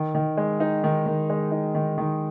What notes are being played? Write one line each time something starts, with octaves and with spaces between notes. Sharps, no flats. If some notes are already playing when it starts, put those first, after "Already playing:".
Already playing: D#3
D#3
G#3
D#4
D#3
D#3
G#3
D#4
D#3
D#3